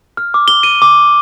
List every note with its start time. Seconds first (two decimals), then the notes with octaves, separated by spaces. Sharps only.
0.17 F6
0.34 D6
0.48 G7
0.63 D#7
0.82 D6